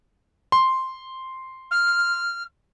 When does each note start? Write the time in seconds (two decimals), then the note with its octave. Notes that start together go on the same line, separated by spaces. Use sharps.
0.52 C6
1.71 F6